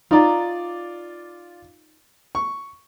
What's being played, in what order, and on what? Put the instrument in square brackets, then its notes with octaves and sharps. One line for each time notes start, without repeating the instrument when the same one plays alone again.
[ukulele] D#4 A#5 [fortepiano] F4 D5
[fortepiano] C#6